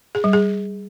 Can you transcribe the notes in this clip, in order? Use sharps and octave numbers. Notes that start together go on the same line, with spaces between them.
G#4
G3
G#4